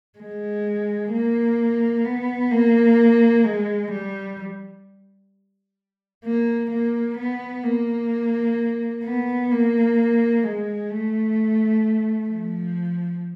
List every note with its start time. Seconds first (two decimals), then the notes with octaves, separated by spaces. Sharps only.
0.19 G#3
1.12 A#3
2.05 B3
2.52 A#3
3.45 G#3
3.92 G3
6.24 A#3
6.71 A#3
7.18 B3
7.64 A#3
9.04 B3
9.51 A#3
10.44 G#3
10.90 A3
12.30 F3